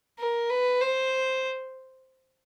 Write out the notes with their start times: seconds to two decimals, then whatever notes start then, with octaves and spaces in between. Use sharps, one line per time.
0.18 A#4
0.50 B4
0.81 C5